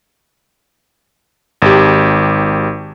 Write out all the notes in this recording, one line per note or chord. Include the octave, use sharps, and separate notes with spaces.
G#1 G4